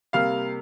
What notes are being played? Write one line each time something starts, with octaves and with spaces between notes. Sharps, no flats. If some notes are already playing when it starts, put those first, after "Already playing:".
C3 G3 A#3 F5 F6